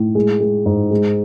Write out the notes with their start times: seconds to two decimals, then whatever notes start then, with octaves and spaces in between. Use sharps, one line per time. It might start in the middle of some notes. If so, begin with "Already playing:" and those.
Already playing: A2
0.15 G#3
0.40 G#3
0.66 G#2
0.91 G#3